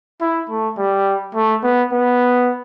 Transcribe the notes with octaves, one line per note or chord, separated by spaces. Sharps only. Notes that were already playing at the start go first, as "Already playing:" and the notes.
E4
A3
G3
A3
B3
B3